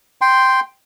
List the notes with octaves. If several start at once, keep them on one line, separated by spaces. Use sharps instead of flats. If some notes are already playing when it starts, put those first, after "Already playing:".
G5 C6